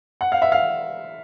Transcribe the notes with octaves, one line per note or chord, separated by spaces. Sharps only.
F#5
F5
E5
F5